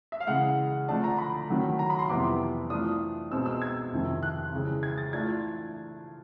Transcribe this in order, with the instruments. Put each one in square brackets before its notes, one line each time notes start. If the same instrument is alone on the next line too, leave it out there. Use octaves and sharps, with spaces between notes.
[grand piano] E5
F5
C#3 E3 G#3 F#5
D3 F3 A3 D4 A5
A#5
B5
D#3 F#3 A3
A#5
B5
C6
F2 C3 E3 G3 B3 D6
E3 A3 D4 F4 D#6
B2 G#3 C4 D#4 E6
E6
G#6
F2 C3 D#3
F#6
C#3 E3 G#3
G#6
A6
E3 A3 D4 F4 G#6